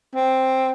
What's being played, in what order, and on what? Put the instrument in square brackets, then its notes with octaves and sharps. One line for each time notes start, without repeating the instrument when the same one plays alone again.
[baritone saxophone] C4